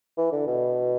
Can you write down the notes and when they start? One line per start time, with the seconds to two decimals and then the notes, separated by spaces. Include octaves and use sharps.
0.18 E3
0.32 D3
0.47 B2